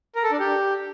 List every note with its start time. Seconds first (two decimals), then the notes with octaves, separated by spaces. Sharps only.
0.16 A#4
0.24 A4
0.32 D4
0.40 G4